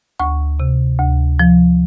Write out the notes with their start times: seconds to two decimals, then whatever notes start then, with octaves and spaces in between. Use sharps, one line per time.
0.20 D2 C#6
0.60 C3
0.99 D2
1.39 F3